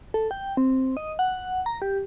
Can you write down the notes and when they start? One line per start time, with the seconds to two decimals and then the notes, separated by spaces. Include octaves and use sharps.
0.14 A4
0.31 G5
0.57 C4
0.97 D#5
1.19 F#5
1.66 A#5
1.82 G4